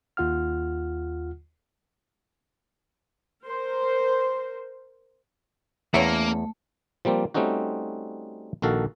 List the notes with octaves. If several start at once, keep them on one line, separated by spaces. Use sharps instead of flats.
D#2 F4 F#5 F6
A#4 C5
E2 A3 A#3 C#4 C#5 E5
F3 G3 A#3 C4
G3 A3 C4 C#4 D#4 F#4
A#1 D#3 F#4 A4 F5